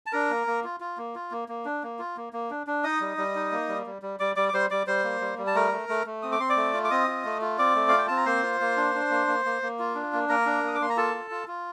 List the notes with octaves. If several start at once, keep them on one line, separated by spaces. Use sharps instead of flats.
A5
D4 A#4 A#5
A#3
A#3
F4
F4
A#3
F4
A#3
A#3
D4
A#3
F4
A#3
A#3
D4
D4
D#4 D#5 D#6
G3
G3
D#4
A#3
G3
G3
G3
G3 D5 D6
G3 D5 D6
D6
G3 C5 C6
G3 D5 D6
G3 C5 C6
A#3
G3
G3
A5
A3 A#4 A#5
A3
A3
A3
C4 D#6
D6
C4 C6
D5 D6
A3
F4
D6
C4 D#5 D#6
F4
A3
F4
C4 D5 D6
A3
F4 F5
G5
C4 A5
A#5
A#3 C5 C6
F4
A#3
D4
D4
A#3
A#3
A#3
A#3
F4
D4
A#3
A#3 A#4 A#5
D4
A#3 D#6
D6
A#3 C6
A#5
F4 A4 A5
F4
F4
F4